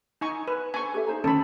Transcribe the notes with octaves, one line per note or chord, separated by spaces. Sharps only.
D#4 G#5 C#6
B4
D4 C5 G#5 C#6
G4 A4 E5
D#4 C5 A#5
D2 D#3 C#4 A4 B5